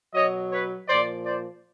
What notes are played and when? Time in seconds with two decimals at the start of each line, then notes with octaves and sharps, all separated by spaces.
0.14 B2 F#3 C#5 D#5
0.51 B4 C#5
0.88 A#2 F3 C5 D5
1.25 C5 D5